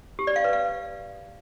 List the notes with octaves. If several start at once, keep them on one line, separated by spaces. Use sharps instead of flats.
G4
D5
F5
B4
F5